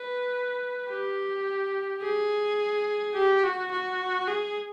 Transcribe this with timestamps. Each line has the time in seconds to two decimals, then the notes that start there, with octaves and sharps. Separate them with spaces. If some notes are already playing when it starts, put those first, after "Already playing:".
Already playing: B4
0.89 G4
2.02 G#4
3.14 G4
3.44 F#4
3.71 F#4
4.28 G#4